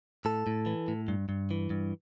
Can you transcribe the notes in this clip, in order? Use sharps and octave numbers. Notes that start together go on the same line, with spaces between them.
A2 A4
A2
E3
A2
G2
G2
E3
G2